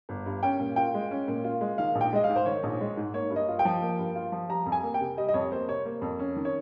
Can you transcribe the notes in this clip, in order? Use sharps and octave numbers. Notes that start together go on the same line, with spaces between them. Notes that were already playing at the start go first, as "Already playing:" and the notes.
G1
G2
C#4 G5
A#2
F4 G5
G#3
C#4
A#2
F4
G#3
D#3 F5
A#1
G5
G#3 D#5
F5
G#2
C5
D#3 C#5
A#1
G#3
G#2
A#3 C#5
G2
D#5
F4
G5
F3
A#3
G2
F4
F3
G3 A#5
F2
G#5
A#3
G5
C3
G3 D#5
D#5
F2 C#5
A#3 C5
C3 C#5
A#3
F2
C#4
D#3
C#5